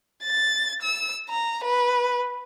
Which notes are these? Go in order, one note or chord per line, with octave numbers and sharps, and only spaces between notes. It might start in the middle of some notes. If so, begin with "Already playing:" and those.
A6
E6
A#5
B4